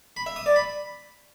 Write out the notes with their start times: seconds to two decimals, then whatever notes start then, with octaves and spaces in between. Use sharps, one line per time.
0.17 B5
0.26 E5
0.36 D#6
0.46 D5
0.56 B5